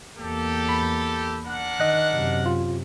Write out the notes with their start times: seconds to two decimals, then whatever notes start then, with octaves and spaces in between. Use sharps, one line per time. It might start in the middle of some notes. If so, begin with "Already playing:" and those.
0.18 E2 A#3 G4 A4
0.69 B5
1.45 D4 A#4 F#5
1.80 D#3 D#5 F#6
2.12 F#2 C3
2.46 F4